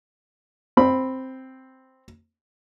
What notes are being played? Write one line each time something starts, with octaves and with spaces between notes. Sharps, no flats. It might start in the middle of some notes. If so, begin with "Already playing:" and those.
C4 B5